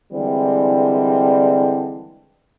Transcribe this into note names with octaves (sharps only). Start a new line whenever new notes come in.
D3 E3 G3 G#3 C4